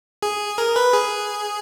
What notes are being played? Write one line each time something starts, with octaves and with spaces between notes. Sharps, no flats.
G#4
A#4
B4
G#4